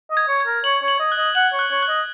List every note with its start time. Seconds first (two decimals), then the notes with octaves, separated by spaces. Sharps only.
0.11 D#5
0.17 G#6
0.28 C#5
0.40 G#6
0.47 A#4
0.64 C#5 F#7
0.82 C#5
0.88 F#7
1.00 D#5
1.12 F#6
1.18 D#5
1.35 F#5 F#7
1.53 C#5
1.59 F#6
1.71 C#5
1.83 F#6
1.89 D#5